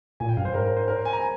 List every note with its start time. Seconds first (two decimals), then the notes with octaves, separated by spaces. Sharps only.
0.20 A#2 G#5
0.29 G5
0.37 G2 F5
0.45 C5
0.54 G#2 A#4
0.65 A#4
0.77 C5
0.88 A#4
0.96 C5
1.05 G#5
1.13 A#5
1.22 G#5